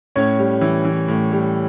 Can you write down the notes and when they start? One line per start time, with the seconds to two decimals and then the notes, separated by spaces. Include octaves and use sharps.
0.16 A2 C#4 C#5
0.39 G3
0.61 E3
0.85 E3
1.08 A2
1.32 G3